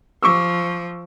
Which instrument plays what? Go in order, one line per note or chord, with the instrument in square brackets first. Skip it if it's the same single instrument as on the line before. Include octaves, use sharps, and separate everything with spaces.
[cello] F3 [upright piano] C#6 D6 E6